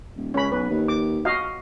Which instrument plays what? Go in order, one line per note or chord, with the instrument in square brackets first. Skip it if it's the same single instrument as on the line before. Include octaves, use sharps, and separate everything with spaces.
[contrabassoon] D#1
[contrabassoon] C#2 [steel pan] C#4 B5
[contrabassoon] B1 [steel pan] B4
[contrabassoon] D#2
[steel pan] D6
F#4 D#5 F5